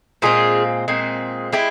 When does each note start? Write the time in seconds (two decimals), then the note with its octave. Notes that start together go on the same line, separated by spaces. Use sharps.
0.22 A#2 G#3 C4 F4 G#4
0.88 A#2 G#3 C4
1.52 G#3 E4 G4